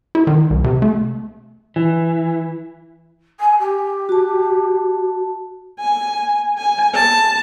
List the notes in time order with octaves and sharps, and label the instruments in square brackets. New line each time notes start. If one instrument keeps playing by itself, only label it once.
[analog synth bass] E4
D#3
C2
C3
A3
[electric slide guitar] E3
[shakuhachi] G#5
G4
[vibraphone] F#4 A5
[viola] G#5
G#5
A5